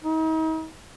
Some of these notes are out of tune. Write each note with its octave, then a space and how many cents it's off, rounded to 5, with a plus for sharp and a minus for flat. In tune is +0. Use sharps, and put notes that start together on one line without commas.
D#4 +40